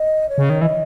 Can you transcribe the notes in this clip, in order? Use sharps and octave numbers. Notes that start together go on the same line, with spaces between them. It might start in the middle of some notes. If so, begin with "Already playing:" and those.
Already playing: D#5
C#5
C#3
D#3
E3 D#5